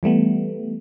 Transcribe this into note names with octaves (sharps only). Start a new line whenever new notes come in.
E3 G3 A3 B3